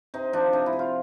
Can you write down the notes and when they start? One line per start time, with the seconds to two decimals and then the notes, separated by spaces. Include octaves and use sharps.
0.14 C3 D#4
0.33 F3 D4
0.53 C3 D#4
0.66 E4
0.73 C3
0.79 F4